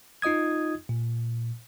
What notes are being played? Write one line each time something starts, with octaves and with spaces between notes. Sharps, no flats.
D#4 F4 D#5 D#6 G#6
A#2